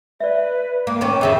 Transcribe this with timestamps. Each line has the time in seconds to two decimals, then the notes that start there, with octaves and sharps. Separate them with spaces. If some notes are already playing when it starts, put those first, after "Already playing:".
0.20 B4 D5 E5
0.87 A#3 D6
1.01 D#3 B3 C#4
1.21 F2 C#3 F3 E5 G5